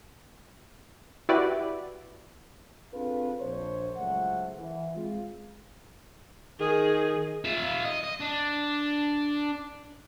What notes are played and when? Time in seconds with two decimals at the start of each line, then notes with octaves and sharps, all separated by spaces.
1.29 E4 F#4 G4 B4 D5
2.93 C4 D4 F4 G#4 A4 B4
3.40 A#1 D4 C5 C#5
3.97 C#2 F#3 A3 C5 F#5
4.58 E3
4.95 G#3 C4 F4
6.60 D#3 G#4
7.45 F4 E5
7.85 D#5
8.04 D#5
8.20 D4